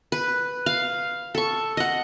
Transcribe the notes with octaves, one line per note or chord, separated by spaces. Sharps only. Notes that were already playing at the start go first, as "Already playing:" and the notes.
B4
F5
A4 C#6
D#5 F#5